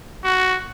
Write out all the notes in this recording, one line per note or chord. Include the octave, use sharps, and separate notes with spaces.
F#4